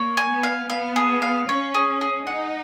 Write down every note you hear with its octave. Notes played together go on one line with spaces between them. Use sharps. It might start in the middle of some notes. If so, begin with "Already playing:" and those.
Already playing: A#3 C#5
G#5
B3
F5
B3 F5
G#4
F5
C#4 C#5
G#4
G#4
D#4 F#5